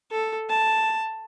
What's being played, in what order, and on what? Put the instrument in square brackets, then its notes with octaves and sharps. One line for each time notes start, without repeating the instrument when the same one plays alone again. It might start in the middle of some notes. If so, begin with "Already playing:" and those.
[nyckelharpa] A4
A5